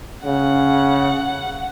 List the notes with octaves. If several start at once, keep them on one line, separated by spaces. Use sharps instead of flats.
C#3 F#5